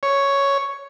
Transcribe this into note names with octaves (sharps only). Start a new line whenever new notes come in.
C#5